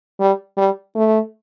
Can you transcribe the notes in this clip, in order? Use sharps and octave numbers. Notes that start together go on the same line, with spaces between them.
G3
G3
A3